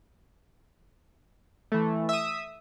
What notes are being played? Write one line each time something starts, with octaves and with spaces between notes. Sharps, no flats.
E3 A3
E5 D#6